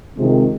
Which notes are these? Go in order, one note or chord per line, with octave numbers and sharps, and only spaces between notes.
C3 D#3 G#3 C4 F4